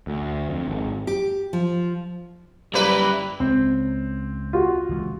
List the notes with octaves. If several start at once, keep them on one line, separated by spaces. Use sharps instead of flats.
D2
F2
G#1
G4
F3
F#2 G3 A#3 E4 B4
C#2 C4
F4 F#4
C#2 E3 G#3